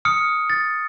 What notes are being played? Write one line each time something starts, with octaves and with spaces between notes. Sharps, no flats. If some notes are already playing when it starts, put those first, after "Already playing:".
D#6 F6 C#7
A6